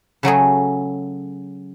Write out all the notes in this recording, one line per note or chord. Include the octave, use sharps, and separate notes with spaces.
C#3 F#3 A3 G#4